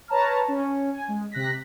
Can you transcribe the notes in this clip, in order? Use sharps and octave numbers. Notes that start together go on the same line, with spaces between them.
B4 C#5 A5 A#5 F6
C#4
G#5
G#3
C3 F#6 A#6 B6